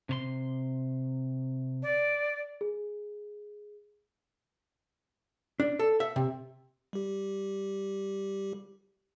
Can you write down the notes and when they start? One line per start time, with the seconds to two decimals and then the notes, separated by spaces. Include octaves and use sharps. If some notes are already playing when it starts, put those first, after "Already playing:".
0.09 C3 C#5 C6
1.82 D5
2.61 G#4
5.60 D4
5.79 A4
6.00 E5
6.16 C3
6.93 G3 G4